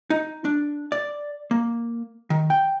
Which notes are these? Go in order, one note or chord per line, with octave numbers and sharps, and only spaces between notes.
D#4
D4
D5
A#3
D#3
G5